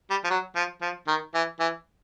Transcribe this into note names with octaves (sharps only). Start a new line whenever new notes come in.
G3
F3
F#3
F3
F3
D#3
E3
E3